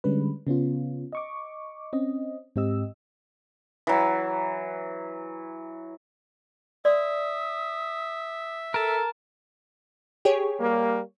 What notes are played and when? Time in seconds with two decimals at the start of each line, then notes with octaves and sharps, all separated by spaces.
0.04 D3 G3 G#3 C#4 B4
0.47 C#3 B3 C#4 F4
1.13 D#5 C#6 D6
1.93 C4 C#4 D#5
2.56 G#2 C4 G4 D#5 E6
3.87 E3 F#3
6.85 D5 E5 C6 D#6
8.74 A4 A#4 A5
10.25 G4 G#4 C#5
10.60 G3 A#3